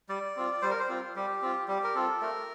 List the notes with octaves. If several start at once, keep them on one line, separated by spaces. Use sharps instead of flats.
G3 D5
C4 F4
G3 C5
A#4
C5
C4 F4
G3 G4
C4 F4
G3 G4
A#4
C4 F4 A4
A3 A#4